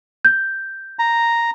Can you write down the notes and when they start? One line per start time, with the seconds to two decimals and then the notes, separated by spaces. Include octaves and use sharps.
0.25 G6
0.99 A#5